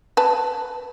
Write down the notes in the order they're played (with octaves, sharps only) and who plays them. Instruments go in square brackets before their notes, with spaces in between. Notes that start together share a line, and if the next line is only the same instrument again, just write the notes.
[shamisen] B4 A5